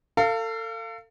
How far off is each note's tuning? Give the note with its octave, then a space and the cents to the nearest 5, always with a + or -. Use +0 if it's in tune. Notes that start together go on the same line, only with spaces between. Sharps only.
A4 +35 F5 -15